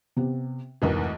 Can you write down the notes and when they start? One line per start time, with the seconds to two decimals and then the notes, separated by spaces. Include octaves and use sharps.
0.16 C3 B3 G4
0.82 F1 D2 G#2 E3 A#4